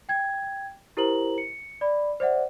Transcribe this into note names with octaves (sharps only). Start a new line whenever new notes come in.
G5 G#6
E4 G4 A#4 C5 A#5 F#7
C#7
D5 B5
C5 D5 E5 F#5